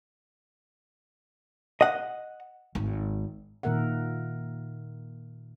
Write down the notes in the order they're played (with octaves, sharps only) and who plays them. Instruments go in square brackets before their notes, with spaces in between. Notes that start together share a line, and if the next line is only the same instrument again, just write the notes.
[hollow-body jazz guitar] D#5 F#5
[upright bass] G#1
[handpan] A#2 D#3 A#3 A#4 E5 F#5